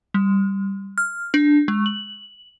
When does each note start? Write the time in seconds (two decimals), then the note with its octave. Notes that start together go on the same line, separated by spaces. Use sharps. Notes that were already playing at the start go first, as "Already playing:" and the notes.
0.14 G3
0.98 F6
1.34 D4
1.68 G#3
1.86 F#7